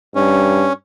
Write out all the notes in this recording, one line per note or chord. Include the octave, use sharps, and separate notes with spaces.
G2 C#4